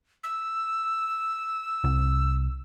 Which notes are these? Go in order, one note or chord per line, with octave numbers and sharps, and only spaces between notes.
E6
C2